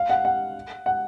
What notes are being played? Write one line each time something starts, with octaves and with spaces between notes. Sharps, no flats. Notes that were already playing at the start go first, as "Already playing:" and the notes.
Already playing: F5
F#5
F#5
F#5